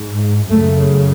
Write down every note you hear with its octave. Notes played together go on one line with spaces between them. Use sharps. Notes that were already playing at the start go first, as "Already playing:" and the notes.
Already playing: G#2
F#2 C#3 A3